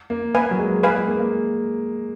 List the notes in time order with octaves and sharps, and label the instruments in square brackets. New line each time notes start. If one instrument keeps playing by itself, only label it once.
[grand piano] A#3
[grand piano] A#3 [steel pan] B4 F5 G#5
[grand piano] F#3
G#3
[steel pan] B4 F5 G#5
[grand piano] G#3
A#3
A#3